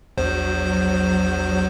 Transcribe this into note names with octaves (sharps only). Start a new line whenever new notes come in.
A#1 E2 F#3 C5